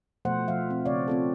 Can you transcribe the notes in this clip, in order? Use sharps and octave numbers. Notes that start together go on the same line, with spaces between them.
B2 F3 A3 C5 F#5
F3 E5 F5
C4
C#3 C4 C#5 D5 F5
C4 F4 A4